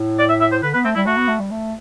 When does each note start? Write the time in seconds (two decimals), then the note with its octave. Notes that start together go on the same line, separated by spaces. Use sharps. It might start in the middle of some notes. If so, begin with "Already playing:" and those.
Already playing: A2
0.19 D5
0.29 E5
0.41 E5
0.52 C5
0.63 D3 B4
0.74 B3 B4
0.85 A3 C4
0.95 G3 E4
1.06 A3 F#4
1.17 B3
1.28 A3
1.40 G3
1.51 A3